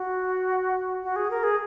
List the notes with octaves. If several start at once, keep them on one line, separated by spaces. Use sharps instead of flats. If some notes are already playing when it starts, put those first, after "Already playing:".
Already playing: F#4
F#4
G#4
A#4
G#4